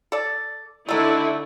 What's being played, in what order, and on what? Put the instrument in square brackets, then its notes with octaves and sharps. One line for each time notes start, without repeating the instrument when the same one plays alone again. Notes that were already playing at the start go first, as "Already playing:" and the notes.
[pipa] A4 D5
[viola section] D3 E4 [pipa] A3 D#4